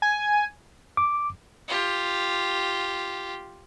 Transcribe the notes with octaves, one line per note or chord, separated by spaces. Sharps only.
G#5
D6
F4 G4